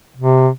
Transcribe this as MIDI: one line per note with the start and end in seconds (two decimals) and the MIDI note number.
0.17 0.49 48